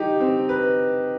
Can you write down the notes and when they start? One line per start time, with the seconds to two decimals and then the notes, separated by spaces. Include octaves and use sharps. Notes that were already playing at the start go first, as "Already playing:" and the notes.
Already playing: D#4 G4
0.20 C4
0.49 B4